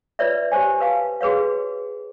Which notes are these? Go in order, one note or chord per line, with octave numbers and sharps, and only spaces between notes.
F4 B4 C#5 D5 E5
G4 C5 C#5 G#5
B4 F5 A5
F#4 G#4 B4 C#5 F5